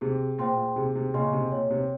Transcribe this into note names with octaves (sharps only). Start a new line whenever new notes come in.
C3 G#4
A#2 C5 G5 C6
A#2
C3 G#4
C3
A#2 C#3 D#5 G#5 C6
C3
A#2 C#5
C3